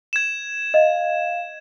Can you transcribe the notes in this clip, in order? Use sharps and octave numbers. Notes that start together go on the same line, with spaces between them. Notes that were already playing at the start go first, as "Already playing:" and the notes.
G#6 E7
D#5 F5